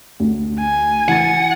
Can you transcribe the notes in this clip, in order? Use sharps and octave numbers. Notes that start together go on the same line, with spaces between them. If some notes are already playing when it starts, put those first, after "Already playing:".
D2
G#5
E3 F#5 A6